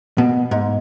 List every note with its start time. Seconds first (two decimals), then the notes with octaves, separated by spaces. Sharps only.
0.18 B2
0.51 G#2